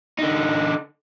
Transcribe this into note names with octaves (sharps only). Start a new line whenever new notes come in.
D3 D#4